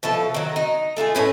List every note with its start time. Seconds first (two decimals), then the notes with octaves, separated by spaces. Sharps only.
0.03 B2 F3 E4 A4
0.34 D#3 F#3
0.56 D#4
0.97 A3 F4 F#4 G#4
1.15 A2 C#4 B4